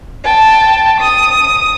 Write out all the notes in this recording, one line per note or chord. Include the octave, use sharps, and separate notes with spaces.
G5 A5
D#6